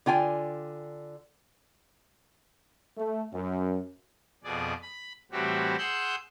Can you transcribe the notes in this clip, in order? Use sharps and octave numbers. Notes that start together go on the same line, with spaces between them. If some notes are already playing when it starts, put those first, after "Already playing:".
D3 F4 G5 G#5
A3
F#2
F2 B2 G#4 D5
B5
A2 E3 G3 C4 F#4 G4
G#4 F#5 C6 E6 F#6 G6